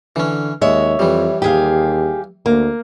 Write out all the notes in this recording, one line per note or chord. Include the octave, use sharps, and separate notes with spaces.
D3 E3 C#4
D#2 G#3 C#5 E5
F2 E3 G3
D#2 G4 G#4 F5
D2 A#3